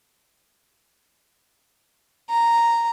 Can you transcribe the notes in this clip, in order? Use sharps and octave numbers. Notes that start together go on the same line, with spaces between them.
A#5